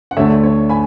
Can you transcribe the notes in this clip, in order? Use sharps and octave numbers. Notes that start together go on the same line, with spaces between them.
F#5
D2 D3 A3 C#5 E5
C#5
G#5 B5